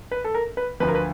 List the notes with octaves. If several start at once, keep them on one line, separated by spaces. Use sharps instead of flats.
B4
A4
A#4
B4
D2 D3 F3 B4
A#4
B4